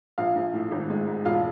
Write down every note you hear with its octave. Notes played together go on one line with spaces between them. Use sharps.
A#1 F4 F5
A#1
A2
G#1
G#3
G#2
E1 F4 F5